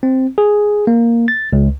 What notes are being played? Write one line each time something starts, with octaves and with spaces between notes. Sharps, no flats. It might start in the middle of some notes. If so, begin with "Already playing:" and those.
C4
G#4
A#3
A6
C#2